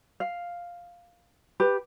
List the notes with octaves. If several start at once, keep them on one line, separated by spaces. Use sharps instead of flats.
F5
G4 B4